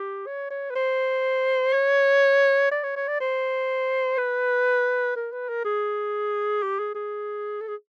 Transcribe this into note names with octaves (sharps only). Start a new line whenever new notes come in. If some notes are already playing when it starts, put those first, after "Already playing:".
Already playing: G4
C#5
C#5
B4
C5
C#5
D5
C#5
C#5
D5
C5
B4
A#4
B4
A#4
G#4
G4
G#4
G#4
A4
G#4